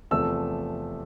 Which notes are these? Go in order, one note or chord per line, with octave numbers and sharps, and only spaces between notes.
E2 C3 F3 A3 E6